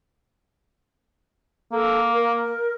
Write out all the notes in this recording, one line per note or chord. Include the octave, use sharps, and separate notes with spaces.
A#3 A4
A#4